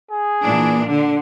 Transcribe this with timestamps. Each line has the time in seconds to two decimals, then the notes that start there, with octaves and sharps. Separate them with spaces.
0.11 G#4
0.43 A#2 E3 A#3 D4
0.88 D3 D4